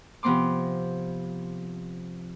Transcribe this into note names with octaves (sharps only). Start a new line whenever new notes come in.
C3 F3 B3 C4 C6 D6